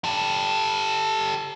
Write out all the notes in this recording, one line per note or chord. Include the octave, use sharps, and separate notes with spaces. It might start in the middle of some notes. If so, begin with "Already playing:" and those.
G4 A4